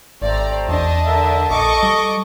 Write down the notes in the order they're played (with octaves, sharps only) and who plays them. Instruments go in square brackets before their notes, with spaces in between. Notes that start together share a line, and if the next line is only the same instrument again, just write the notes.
[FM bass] G#1 [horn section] C3 A3 C4 [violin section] D5 A#5
[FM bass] E2 [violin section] D4 D#5 [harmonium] A5
[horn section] D3 A#4 E5
[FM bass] A#1 [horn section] A4 D#5 [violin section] C#6 D6
[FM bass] G3